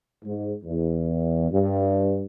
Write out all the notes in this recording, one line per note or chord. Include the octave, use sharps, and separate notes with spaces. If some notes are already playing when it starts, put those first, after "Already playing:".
G#2
E2
G2